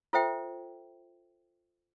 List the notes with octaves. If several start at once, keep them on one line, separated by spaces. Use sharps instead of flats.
F4 A4 C5 E5 G5